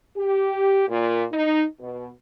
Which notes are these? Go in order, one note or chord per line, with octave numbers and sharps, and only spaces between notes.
G4
A#2
D#4
B2